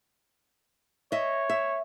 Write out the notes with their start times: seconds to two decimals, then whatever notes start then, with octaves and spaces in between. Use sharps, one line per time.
1.12 C#5 D#5 E5
1.50 E5